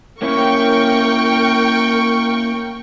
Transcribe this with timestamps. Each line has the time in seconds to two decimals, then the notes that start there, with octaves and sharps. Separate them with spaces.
0.22 A#3 C#4 E4 A#4 G5 C#6